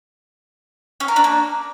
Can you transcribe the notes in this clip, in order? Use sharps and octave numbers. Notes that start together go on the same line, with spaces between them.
C#4
A#4
D4
A#3